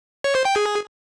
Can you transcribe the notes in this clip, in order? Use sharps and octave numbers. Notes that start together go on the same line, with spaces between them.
C#5
C5
G5
G#4